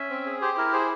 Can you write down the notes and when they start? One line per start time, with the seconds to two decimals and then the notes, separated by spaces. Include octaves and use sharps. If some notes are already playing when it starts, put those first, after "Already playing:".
Already playing: C#4 E5
0.10 C4
0.26 G#4
0.42 G4 C5
0.57 E4 A#4
0.73 G#4 C5